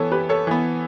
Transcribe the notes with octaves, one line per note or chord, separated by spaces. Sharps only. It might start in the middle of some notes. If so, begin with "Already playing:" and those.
Already playing: E3 B3 A4 C#5
G4 B4
A4 C#5
E3 B3